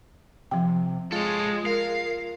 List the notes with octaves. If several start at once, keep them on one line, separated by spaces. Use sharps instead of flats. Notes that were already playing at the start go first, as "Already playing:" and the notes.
C3 F3 G5
G#3 F4 A4 C#5
A#4 F5